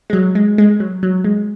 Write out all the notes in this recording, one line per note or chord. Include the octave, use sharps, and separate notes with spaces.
G#3
F#3
G#3
G#3
F#3
F#3
G#3